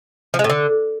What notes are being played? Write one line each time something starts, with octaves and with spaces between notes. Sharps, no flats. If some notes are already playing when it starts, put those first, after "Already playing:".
F3
G#3
A2
D3